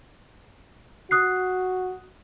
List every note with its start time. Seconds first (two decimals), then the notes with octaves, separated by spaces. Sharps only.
1.11 F#4 D#6 F#6 C7